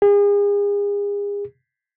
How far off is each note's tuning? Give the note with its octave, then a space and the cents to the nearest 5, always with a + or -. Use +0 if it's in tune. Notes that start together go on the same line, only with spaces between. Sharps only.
G#4 -40